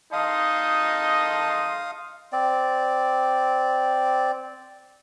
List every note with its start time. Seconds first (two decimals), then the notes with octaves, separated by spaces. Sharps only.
0.13 D#4 D#5 F5 A5 C6 D#6
2.32 C4 D5